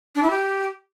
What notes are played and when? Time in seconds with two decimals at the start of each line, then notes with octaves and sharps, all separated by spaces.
0.15 D4
0.23 E4
0.30 G4